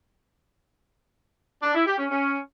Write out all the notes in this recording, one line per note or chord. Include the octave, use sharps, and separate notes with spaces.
D4
E4
G4
C#4
C#4